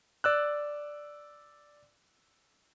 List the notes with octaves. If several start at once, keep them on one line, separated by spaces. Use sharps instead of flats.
D5 E6 F#6